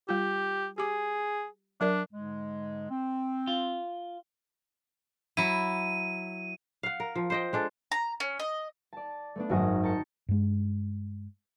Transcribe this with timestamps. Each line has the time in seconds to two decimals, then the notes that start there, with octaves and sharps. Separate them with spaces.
0.09 G3 F4 G4
0.78 G4 G#4 D6
1.81 F#3 D4 A#4 D5
2.13 G#2 D3 G#3
2.91 C4
3.47 F4
5.37 F#3 E4 D#7
6.83 F5 F#5
7.00 A#4
7.15 F3
7.30 C5 D#5 G5
7.53 G#3 D4 A4
7.92 A#5
8.20 C#4
8.40 D#5
8.93 D5 A5
9.35 A3 B3 D4
9.49 G#1 F#2 G#3 F#4 A#5 D#6
9.83 G5 A5 A#5 C#7
10.29 G2 G#3